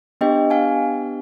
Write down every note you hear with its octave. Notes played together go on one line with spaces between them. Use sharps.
B3 D4 G4 D#5 G5
F5 G#5